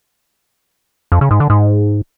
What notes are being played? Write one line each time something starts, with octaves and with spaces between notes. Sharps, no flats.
F2
C#3
G#2
D3
G#2